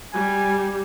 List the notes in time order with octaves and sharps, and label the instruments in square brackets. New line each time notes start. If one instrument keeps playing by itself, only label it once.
[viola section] G3 [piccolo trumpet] G#5